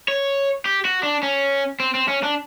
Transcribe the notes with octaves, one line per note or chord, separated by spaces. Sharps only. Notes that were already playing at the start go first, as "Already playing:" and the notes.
C#5
G4
F#4
D4
C#4
C4
C4
C#4
D4